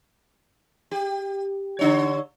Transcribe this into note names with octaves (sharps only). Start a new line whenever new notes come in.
G4
D3 D4 C#5